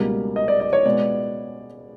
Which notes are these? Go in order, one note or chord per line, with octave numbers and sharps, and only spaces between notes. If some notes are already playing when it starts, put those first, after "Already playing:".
Already playing: C#2 B2 G3 A#3
D#5
D5
D5
C#5
B2 G#3 B3 D5